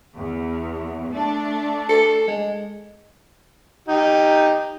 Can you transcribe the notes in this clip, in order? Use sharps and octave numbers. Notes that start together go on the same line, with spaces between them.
E2
A3 D4
A4
G#3
D#4 G4